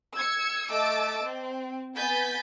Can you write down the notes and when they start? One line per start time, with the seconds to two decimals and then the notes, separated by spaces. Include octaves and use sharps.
0.16 E6 G#6 C#7
0.71 A3 D#5 A5 D6 E6
1.25 C4
1.96 B3 G#5 G6 A6 B6